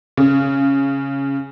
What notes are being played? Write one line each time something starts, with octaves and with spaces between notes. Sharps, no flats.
C#3